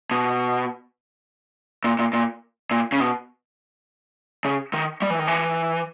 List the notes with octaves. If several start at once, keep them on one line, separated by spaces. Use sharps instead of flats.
B2
A#2
A#2
A#2
A#2
C#3
B2
C#3
D#3
G3
E3
D#3
E3